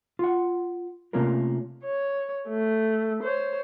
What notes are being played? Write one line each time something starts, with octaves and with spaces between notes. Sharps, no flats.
F4 F#5
C3 A3 A#3 C#4 F4 A#4
C#5
A3
C5 C#5